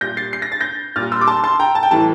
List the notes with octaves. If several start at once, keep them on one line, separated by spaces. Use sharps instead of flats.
A#2 G3 G6 A#6
A6 C7
C7
A#6
A6
G6 A#6
A#2 G3 F6 A6
C6 E6
D6
A5 C6
A5 C6
G5 A#5
A5
G5
A2 E3 G3 A5